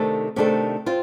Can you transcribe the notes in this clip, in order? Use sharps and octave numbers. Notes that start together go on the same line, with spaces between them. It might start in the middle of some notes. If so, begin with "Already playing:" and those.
Already playing: C3 D#3 A3 D4 A4
C3 D#3 A3 D4 A4
C4 F4